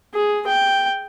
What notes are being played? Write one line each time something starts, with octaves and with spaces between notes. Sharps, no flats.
G#4
G5